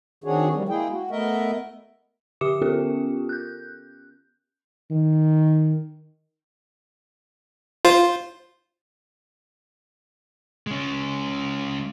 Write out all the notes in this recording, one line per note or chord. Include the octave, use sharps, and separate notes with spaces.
D#3 C4 D4 F#4 G#4 C#5
F3 G3 A#3
G#3 A#3 E4 G#4 G5
F#4
A3 B3 A#4 D#5 E5
D3 G4 E5 D6 C#7 E7
B3 C#4 F4 G4 A4 A#4
F#6 G6
D#3
F4 C5
G#3 C#4